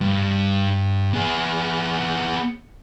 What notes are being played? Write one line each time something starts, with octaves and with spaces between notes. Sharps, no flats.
G2
B3 G#4